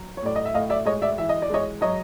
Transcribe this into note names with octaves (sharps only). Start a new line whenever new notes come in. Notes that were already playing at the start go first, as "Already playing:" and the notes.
Already playing: F#3
C#5
A2 D5
D#5
E5
A2 D#5 F5
D5 E5
G#3 C#5 D#5
D5 E5
E3 E5
D#5
D5
G#3 C#5 D#5
F#3 C#5 D#5